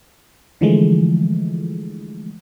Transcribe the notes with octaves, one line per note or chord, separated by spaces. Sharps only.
D3 E3 F3 G#3 A3